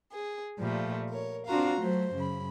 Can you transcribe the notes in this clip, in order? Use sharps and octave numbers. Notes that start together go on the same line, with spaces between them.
G#4
A#2 F3 G3 A3
A#4 C#5
C4 D4 F4 F#4 F5 A#5
F#3 A3 C5
F#2 C#3 B5